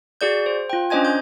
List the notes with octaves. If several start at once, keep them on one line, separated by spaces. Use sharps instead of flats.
F#4 G#4 D5 G6
C5
F4 G5
C#4 D4 C5 D#5 G#5 G#6
G6